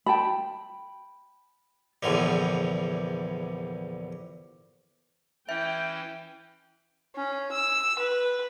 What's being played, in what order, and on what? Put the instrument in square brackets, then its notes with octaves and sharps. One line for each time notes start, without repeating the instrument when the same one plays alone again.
[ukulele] G5 A5 B5
[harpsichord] A#1 E2 D3 E3 G3
[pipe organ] E3 C#4 E4 [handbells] E5 [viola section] G5
[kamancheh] C#4
E6
B4